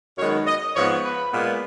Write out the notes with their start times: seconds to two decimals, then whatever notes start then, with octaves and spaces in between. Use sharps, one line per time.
0.18 F#2 D#3 G#3 B3 C#5
0.46 D#5
0.75 G#2 F3 B3 C#5
1.03 B4
1.32 A#2 G#3 B3